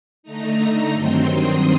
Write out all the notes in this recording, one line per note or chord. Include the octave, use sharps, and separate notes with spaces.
D3 A3 D#4 A#5
G2 D#3 F#3 C4 C6
D#6